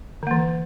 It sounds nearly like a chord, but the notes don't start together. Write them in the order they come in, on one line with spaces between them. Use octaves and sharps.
D3 A#3 E3